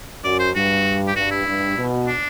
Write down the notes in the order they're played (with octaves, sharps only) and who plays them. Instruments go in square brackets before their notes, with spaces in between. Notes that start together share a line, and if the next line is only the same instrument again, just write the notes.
[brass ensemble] F#2 [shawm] D5
[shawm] C5
[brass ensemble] G2 [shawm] F#4
[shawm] G4
[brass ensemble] G2 [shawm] F#4
[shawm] E4
[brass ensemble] G2
B2
[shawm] D4